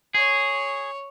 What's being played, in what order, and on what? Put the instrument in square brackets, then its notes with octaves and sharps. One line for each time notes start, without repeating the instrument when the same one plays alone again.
[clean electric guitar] G#4 [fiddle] C#5